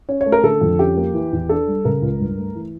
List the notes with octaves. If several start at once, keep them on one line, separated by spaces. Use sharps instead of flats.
C#4 C#5
C#5
A3
A#4
D3 A4
F2
C#4 G4
A#3
E3
E2
D4 A4
G3
C#3 A#4
C#2
G2
A3
E3